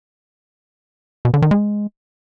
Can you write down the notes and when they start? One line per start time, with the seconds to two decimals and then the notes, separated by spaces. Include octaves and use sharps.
1.25 B2
1.34 D3
1.42 D#3
1.51 G#3